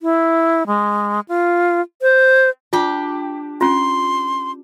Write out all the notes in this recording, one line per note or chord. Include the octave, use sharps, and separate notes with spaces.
E4
G#3
F4
C5
D4 F4 G4
C#4 F4 C6